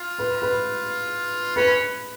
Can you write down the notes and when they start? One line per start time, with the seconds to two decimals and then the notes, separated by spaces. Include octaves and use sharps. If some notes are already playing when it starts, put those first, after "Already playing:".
Already playing: F4
0.19 B4
0.42 B4
1.56 C#4 B4